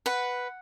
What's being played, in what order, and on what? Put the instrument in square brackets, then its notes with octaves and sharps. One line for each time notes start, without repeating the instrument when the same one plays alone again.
[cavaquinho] B4 F#5